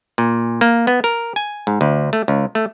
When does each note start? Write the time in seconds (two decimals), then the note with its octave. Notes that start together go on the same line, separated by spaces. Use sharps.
0.18 A#2
0.61 A#3
0.87 B3
1.04 A#4
1.36 G#5
1.67 G#2
1.81 D2
2.13 A3
2.28 C#2
2.55 A3